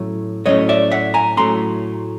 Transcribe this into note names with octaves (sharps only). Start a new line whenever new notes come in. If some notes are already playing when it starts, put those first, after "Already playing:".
Already playing: A2 F#3 A3 C#4
A2 F#3 A3 C#4 C#5 D#5
D5 E5
E5 F#5
G#5 A#5
A2 F#3 A3 C#4 A#5 C6